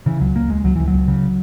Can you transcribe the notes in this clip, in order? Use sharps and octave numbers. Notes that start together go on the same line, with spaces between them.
C#3 E3
C#2 F#3
C#2 A#3
C#2 G#3
C#2 F#3
C#2 E3
F#3
C#2
C#3